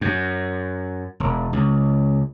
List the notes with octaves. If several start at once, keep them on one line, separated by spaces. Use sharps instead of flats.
F#2
E1
C#2